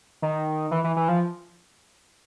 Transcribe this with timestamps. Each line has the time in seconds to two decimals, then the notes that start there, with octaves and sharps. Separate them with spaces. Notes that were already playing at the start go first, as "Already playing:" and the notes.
0.22 D#3
0.71 E3
0.84 E3
0.96 E3
1.08 F3